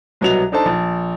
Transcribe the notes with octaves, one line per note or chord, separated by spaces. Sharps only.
C2 B2 F#3 B3 D#5 F7
D4 D#4 A4 C5 A5
A#1 A5